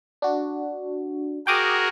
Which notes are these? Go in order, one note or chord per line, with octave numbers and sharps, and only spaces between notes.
D4 F#4
F#4 G#4 A#4 G5 D6 D#6